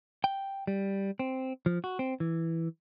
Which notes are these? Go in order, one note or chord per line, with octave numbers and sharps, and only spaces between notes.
G5
G3
C4
F3
F#4
C4
E3